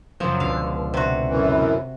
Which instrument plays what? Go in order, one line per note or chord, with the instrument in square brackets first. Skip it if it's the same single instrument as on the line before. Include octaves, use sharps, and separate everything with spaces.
[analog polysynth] F#2 C#3 F#3 [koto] F3
[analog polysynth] C#2 B2 D3 [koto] F5
[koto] C3 F#4
[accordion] F#2 E3